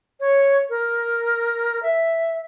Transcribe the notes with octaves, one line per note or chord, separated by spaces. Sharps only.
C#5
A#4
E5